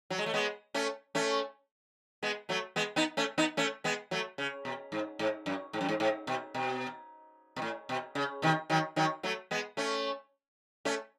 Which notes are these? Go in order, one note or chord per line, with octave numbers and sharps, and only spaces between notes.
F#3
G#3
A3
G#3 B3
A3 C#4
A3 C#4
G#3 B3
F#3 A3
G#3 B3
B3 D#4
A3 C#4
B3 D#4
A3 C#4
G#3 B3
F#3 A3
C#3
B2
G#2
G#2
F#2
G#2
F#2
G#2
G#2
B2
B2
B2
A2
B2
C#3
B2 D#3
D#3 F#3
D#3 F#3
F#3 A3
G#3 B3
A3 C#4
A3 C#4